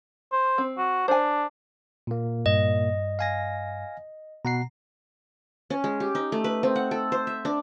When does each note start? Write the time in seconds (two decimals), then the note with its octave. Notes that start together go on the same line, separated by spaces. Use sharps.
0.32 C5
0.58 C4
0.77 F#4
1.08 D4 C5 G#5
2.07 A#2 A#3
2.46 G2 D#5
3.19 F5 G#5 A#6
4.45 B2 F#5 A#5 C7
5.70 C#4
5.84 G#3
6.00 G4
6.15 D#4
6.32 A3
6.44 B4
6.63 C4
6.76 F#5
6.91 A4
7.12 C5
7.27 E5
7.45 D4